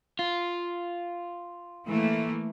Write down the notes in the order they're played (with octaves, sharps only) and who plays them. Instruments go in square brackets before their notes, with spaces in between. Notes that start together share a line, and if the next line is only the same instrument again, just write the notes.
[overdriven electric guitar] F4
[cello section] E3 A3 A#3